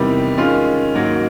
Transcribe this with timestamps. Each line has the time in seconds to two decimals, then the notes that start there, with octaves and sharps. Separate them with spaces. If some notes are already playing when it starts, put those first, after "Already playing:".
Already playing: E2 C3 D#3 G3
0.37 D#3 G#3 C#4 F4
0.95 G#2 D#3 F#3 A#3 D#4